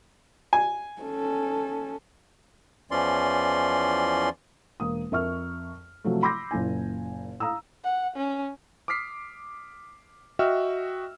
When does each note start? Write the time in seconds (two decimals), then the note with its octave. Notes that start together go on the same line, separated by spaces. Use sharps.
0.53 G#5
1.02 C#4 A4
2.91 E2 E3 F3 C#4 D5 C6
4.80 E1 A#3 D#6
5.12 F2 A#4 E5 C#6 F6
6.04 C3 F3 F#3 A3
6.23 B5 C6 D6 E6 G6 A#6
6.51 F#1 A#2 E4 G#5
7.40 F5 A#5 D#6 E6
7.84 F#5
8.16 C#4
8.88 D6 D#6 F6 B6 C7
10.39 F#4 D#5 E5 G5 E6 F6